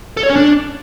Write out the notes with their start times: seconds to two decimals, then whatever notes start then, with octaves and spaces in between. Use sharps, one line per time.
0.17 A4
0.23 C#5
0.30 C#4
0.36 D4